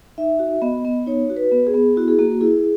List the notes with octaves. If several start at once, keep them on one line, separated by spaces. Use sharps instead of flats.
D#4 E5
F#4
B3 D#5
B3
D#4 C#5
F#4
B4
B3
G#4
B3
E4 F#4
G#4
A#3 F#4
F#4
E4 G#4